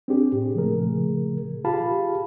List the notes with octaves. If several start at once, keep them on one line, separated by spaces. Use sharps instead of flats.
C4 D4 G4 G#4
A2
A#2 C#3 F3 A3 G#4 A#4
F4 G4 G#4 F5 A5 B5